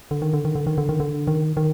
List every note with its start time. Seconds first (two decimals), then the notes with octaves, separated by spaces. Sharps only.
0.11 D3
0.22 D#3
0.33 D3
0.45 D#3
0.55 D3
0.67 D#3
0.78 D3
0.89 D#3
1.00 D3
1.27 D#3
1.57 D#3